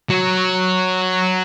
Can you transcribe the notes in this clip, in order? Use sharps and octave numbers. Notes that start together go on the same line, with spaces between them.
F#3